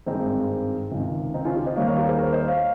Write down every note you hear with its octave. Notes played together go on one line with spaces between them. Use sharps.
G#1 G2 D#3 G#3 C4 D#4
C#2 C3 D#3
C4 D#4
C#4 F4
D#4 G4
C5 D#5
D#2 D#3 G3 A#3 C#5 F5
C#5 F5
G4 A#4
G#4 C5
A#4 C#5
C5 D#5
C#5 F5